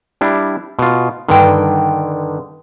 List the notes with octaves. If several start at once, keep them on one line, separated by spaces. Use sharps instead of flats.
G3 D4 E4
B2 F4
G2 D3 D#3 G5